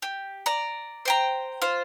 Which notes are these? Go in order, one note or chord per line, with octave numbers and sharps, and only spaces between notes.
G4
D5 A#5
C5 G5 A#5
F4 C5